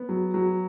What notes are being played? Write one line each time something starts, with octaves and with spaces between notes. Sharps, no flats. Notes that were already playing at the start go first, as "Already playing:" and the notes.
Already playing: B3
F#3
F#3